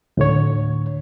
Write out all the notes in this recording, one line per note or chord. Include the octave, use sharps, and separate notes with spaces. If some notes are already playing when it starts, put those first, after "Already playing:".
D2 A2 D3 C#5